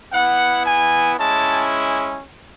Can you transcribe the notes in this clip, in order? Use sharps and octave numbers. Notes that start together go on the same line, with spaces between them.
B3 E4 F#5
G#5
G#3 C#4 E4 A5